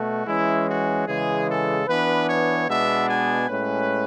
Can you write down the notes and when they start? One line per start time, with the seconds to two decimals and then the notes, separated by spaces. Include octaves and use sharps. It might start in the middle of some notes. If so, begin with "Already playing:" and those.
Already playing: B2 A3 F#4
0.26 E3 G#3 C#4 E4
0.66 F#4
1.06 C#3 E3 G#3 G#4
1.47 A4
1.87 E3 B3 D4 B4
2.26 C#5
2.67 B2 G#3 B3 D4 E5
3.07 G#5
3.47 A2 G#3 C#4 B4